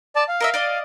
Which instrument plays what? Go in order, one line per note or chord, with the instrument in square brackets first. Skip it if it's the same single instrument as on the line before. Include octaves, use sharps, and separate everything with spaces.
[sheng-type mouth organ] D5 A5
F5
[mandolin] A#4 D#5 E5
D5 D#5